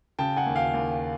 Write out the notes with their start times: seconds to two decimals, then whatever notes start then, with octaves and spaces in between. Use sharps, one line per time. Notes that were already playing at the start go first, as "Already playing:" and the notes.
0.19 C#3 G5 A5
0.36 F#5 G#5
0.46 D#2
0.56 F5 G5
0.74 D#2